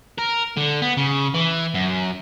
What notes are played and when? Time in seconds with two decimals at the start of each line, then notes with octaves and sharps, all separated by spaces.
0.19 A#4
0.57 D3
0.82 B3
0.97 C#3
1.34 E3
1.75 F#2